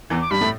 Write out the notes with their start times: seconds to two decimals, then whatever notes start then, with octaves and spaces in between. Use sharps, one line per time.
0.10 E2 E3
0.21 D6
0.31 G2 G3 B5
0.41 A2 A3